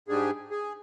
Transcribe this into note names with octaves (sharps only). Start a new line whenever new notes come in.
G#2 G3 D4 G#4
G#4